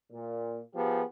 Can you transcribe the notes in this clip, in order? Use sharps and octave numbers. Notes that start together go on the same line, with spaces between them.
A#2
F3 B3 G4 G#4